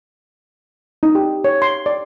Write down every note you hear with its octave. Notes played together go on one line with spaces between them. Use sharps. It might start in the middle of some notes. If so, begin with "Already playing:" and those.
D#4
G4
C#5
C6
D5